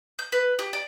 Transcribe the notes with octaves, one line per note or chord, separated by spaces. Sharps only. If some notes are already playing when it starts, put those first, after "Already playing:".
G6
B4
G4
D5